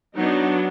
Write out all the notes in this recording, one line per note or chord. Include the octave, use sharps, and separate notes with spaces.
F#3 B3 D4 D#4